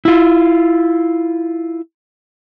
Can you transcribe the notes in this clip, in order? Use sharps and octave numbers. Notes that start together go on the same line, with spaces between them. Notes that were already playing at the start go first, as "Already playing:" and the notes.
E4 F4